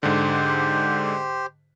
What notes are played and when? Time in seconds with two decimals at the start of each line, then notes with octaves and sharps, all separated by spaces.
0.03 G#2 D3 G4 C5